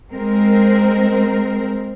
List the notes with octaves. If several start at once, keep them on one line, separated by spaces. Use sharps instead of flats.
G#3 C4 A#4